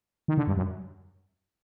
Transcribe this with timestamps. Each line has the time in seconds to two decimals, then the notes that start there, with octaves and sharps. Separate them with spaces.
0.28 D#3
0.37 D3
0.47 G2
0.57 F#2